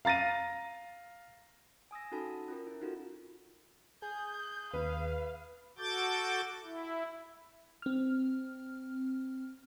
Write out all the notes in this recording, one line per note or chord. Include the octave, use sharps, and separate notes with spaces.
F5 A#5 A6 A#6 D#7
G#5 D#6 E6 A#6
C#4 D#4 F#4 A4 A5 B5
C#4 F4 A#4
E4
C#4 D#4 F4 F#4 A4
G#4 G6
D#2 B4 F5
F#4 A4 D6 G6 A6
E4
C4 F6